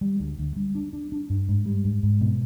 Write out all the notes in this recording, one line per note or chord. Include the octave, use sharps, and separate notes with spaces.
G3
D2
D2
G3
D4
D4
D4
G2
G#2
G3
G#2
G#2
B2